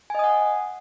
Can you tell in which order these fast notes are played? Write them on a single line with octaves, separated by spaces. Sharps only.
G#5 D#5 D#6 F#5